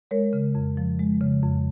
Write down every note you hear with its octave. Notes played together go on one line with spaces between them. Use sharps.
G#3 A#4 C#5
C#3
F2
F3
G#3
C#3
F2